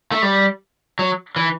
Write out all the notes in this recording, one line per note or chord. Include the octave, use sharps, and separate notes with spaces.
A3
G3
F#3
E3